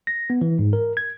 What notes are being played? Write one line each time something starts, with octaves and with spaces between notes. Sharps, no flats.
A#6
B3
E3
G#2
A#4
G#6